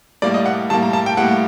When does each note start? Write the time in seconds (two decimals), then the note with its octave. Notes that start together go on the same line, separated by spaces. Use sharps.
0.22 A2 G3 A#3 D5
0.34 D#5
0.46 F#5
0.70 A2 G3 A#3 A5
0.82 A#5
0.93 A5
1.06 G5
1.17 A2 G3 A#3 F#5